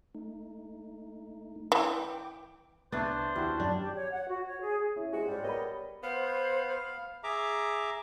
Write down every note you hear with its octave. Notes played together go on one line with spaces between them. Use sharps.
A3 D#4
E3 G5 D6
C2 B3 D4 C5 D5 E5 C#6
D#2 G3 E4 F#4 F#5
F#2 C#4 D4
G4
C#5
F#5
F#4
C#5
G#4
C#4 E4
G#3 F#4 G#4 C5
G#2 G3
B3 A#4 C#5 D#5 B5
B3 C5 F5
G#4 E5 A#5 D6